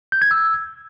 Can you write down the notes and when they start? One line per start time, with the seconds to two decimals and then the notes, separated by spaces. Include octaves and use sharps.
0.12 G6
0.22 G#6
0.31 E6